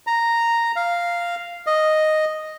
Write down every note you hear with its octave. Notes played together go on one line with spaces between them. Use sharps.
A#5
F5
D#5